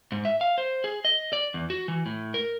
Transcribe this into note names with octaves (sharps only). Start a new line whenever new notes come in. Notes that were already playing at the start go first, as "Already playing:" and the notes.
G#2
E5
F5
C5
G#4
D#5
D5
E2
F#4
E3
A2
A#4